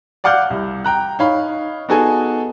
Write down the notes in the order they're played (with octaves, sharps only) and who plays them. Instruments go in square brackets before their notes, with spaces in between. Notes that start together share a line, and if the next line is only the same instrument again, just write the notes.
[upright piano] D5 F5 F#5 D6 F6 G6
C2
G5 A#5 F#6
D#4 C#5 F5 B5
B3 D#4 F#4 G#4 A4 G#5